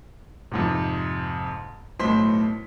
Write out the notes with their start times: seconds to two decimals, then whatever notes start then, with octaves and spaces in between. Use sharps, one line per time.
0.52 F2 G#2 C3
1.99 B1 A2 C5 C6 B6